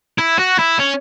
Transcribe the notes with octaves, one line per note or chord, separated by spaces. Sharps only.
E4
F#4
E4
C#4